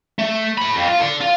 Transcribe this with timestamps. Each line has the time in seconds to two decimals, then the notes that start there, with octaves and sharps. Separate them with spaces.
0.19 A3
0.58 A4 B5
0.76 F2
0.88 F4
1.00 A4 D5
1.21 F4